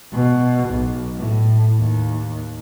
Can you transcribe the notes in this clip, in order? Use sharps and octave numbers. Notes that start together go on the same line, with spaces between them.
B2
B1
A2
D#2